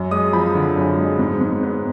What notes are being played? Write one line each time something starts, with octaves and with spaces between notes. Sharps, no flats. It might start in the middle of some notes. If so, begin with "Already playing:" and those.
Already playing: F#2
G#3 D#6
F3 B5
D3
F#2
G#3
G#2
G#2
B3